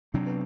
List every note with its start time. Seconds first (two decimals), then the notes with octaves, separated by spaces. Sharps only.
0.14 C3 F#3 C4 D4
0.26 B3